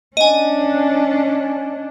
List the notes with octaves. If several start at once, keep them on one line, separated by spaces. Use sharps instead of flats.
C#4 D4 D#5 G#5